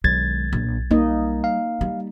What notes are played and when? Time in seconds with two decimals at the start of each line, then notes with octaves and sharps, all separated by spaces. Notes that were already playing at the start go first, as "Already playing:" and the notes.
0.04 B1 D#3 G#3 G#6 A6
0.53 A#1
0.91 G3 A#3 D#4 D#5
1.44 F5
1.81 G3